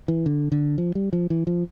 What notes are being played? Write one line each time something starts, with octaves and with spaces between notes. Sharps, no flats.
E3
D3
D3
F3
G3
F3
E3
F3